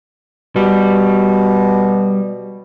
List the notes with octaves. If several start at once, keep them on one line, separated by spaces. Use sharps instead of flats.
B2 G3